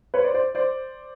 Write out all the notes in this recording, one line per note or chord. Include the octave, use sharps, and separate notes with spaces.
B4 C#5
C5 D5
C5 D5
C5 D5